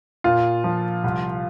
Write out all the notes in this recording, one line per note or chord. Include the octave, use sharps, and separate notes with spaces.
A#2 F4
F3
C2